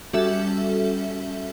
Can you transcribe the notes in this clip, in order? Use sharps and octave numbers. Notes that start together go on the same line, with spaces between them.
G3 C#4 F#4 A4 E5